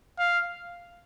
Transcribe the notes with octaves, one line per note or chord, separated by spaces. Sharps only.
F5